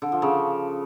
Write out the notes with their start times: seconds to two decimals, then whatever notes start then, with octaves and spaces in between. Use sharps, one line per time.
0.02 D3
0.12 F3
0.22 C#3